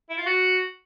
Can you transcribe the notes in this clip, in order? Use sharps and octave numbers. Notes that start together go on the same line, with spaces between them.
E4
F4
F#4